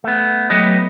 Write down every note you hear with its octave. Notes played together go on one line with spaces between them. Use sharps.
A3 B3
F#3 A3 B3 G4 B4 D#5